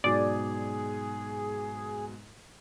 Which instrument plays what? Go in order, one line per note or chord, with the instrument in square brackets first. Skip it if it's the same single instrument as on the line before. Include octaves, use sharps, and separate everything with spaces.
[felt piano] G#2 B2 F#3 [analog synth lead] G#4 [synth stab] D5